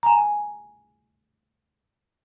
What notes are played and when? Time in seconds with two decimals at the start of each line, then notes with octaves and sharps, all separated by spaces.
0.03 G#5 A#5